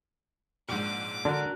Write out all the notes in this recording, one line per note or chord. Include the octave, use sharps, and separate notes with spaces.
A#1 G#2 D6
D3 D4 F#4 A#4